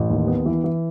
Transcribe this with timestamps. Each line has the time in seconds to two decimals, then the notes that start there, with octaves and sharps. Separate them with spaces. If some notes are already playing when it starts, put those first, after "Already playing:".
Already playing: A1
0.10 D#2
0.27 B3
0.46 E3
0.64 E3